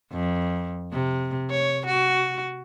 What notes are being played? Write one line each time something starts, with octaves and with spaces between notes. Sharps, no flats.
F2
C3
C#5
F#4